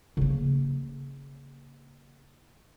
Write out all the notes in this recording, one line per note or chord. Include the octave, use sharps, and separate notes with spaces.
C#3 A#3